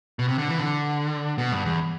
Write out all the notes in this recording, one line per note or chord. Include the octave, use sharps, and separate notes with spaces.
B2
C3
D3
E3
D3
B2
G2
E2